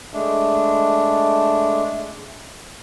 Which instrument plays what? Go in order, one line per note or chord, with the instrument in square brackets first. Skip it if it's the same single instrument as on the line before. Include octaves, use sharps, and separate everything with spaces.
[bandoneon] G#3 A3 D4